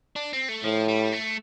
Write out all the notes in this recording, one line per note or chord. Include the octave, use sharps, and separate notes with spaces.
D4
C4
A3
A2 F3
G3
A3